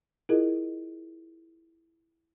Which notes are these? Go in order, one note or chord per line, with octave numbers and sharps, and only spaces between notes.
E4 F4 G#4 A#4 D#5